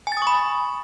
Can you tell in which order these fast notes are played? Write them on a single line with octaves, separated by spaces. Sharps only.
G#5 A6 D#6 C#6 B5